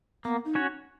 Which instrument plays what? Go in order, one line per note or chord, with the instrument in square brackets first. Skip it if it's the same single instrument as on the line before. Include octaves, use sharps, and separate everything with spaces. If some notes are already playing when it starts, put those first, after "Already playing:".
[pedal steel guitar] A#3 [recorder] B3
[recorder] D#4
[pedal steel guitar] C#4 F#4 C#5